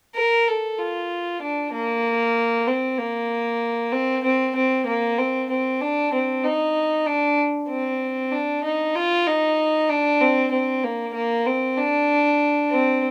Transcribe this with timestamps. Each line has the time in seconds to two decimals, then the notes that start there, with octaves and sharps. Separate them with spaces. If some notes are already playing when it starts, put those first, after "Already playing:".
0.16 A#4
0.48 A4
0.79 F4
1.42 D4
1.73 A#3
2.67 C4
2.98 A#3
3.92 C4
4.24 C4
4.56 C4
4.87 A#3
5.18 C4
5.50 C4
5.81 D4
6.13 C4
6.44 D#4
7.06 D4
7.69 C4
8.32 D4
8.64 D#4
8.95 F4
9.27 D#4
9.89 D4
10.21 C4
10.51 C4
10.84 A#3
11.14 A#3
11.46 C4
11.77 D4
12.71 C4